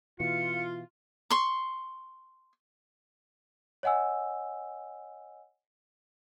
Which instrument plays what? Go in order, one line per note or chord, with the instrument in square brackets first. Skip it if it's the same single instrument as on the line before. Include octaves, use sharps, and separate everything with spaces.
[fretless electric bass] B2 E3 [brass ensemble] F4 [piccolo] C#7
[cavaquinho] C6 C#6
[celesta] C#5 D#5 F#5 G#5 E6